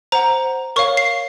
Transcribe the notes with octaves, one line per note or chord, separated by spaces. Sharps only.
C5 F#5 A#5
A#4 C#5 F5 C#6
C7